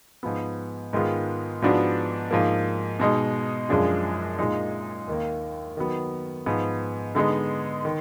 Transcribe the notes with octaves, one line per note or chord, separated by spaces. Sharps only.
G#2 F3 B3
G#2 D#3 G#3 B3 F4
G#2 F3 B3 D4 F#4
G#2 F3 A#3
B2 G#3 D#4
F#2 F3 G#3 D4 G#4
A#2 G#3 D#4
D#2 D#3 A#3
D#3 F#3 B3
G#2 F3 B3
D3 G#3 B3 D#4
D#3